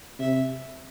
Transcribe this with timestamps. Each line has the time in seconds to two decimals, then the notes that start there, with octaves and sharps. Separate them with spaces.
0.19 C3 E5